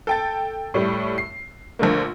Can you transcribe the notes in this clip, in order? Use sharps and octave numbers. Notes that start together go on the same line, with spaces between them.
A4 G5 A6
A2 G3 A3
C7
A#1 D3 A3 A#3